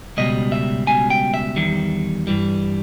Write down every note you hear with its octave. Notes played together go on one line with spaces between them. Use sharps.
C#2 B2 G3 D#5
E5
C#2 B2 G3 G#5
G5
E5
E2 D#3 G3
G2 E3 G3